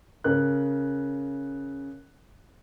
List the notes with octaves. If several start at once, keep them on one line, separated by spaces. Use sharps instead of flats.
C#3 A#4 F#6